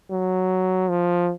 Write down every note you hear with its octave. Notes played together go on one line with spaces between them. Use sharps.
F#3
F3